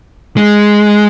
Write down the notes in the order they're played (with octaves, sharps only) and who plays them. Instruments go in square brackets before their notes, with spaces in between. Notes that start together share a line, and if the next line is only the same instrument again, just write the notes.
[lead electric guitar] G#3